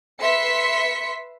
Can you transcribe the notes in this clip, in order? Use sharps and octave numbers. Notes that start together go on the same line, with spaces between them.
B4 E5 C6 B6 C#7